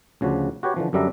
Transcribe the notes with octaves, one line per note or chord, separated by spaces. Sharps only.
D2 C#3 F3 F#4 D5
F#4 G4 B4 C#5
D3 E3 F3
F#2 D3 G3 D4 E5 A#5